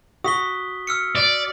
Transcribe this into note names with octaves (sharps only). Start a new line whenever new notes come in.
F#4 D#6 B6 G7
E6 F6 C#7
D5